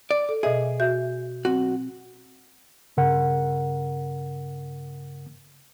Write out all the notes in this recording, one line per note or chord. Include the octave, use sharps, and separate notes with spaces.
D5
A4
B2 G#4 D#5 E5
F#4 E5 G6
B1 C4 F#4
G2 C#3 A#4 F#5